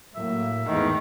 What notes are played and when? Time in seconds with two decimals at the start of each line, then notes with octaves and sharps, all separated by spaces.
0.15 A2 F#3 A#3 E5
0.67 E2 G#2 D#3 A3